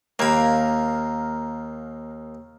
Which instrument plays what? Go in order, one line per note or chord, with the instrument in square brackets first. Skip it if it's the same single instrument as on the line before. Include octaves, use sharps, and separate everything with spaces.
[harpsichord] D#2 B5 [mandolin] A#3 A#4 [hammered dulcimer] F5 A#5